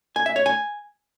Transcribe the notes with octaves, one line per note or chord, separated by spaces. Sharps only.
G#5
E5
C#5
G#5